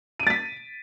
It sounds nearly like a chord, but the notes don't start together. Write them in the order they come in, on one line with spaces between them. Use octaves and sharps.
D#7 D7 A6 B6